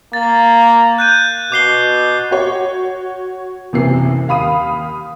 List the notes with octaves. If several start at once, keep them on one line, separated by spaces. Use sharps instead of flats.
A#3 A6
F#6 G6 D#7
B2 D6 C7 G7
F#4 C#5
F#1 C3 E3 C7
D#2 F5 B5 D#6 D#7